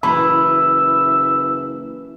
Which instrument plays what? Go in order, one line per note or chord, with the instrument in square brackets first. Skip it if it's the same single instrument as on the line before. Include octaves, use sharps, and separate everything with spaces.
[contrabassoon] F#1 [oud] E3 [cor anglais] E5 [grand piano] B5